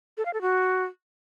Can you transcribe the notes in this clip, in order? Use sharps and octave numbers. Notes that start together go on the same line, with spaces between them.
A4
F5
A4
F#4